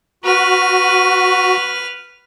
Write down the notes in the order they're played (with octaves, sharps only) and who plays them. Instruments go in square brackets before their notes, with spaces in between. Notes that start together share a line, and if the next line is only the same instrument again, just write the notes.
[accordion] F#4 [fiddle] B4 F6